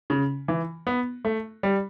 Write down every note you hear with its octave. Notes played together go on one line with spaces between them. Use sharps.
C#3
E3
B3
A3
G3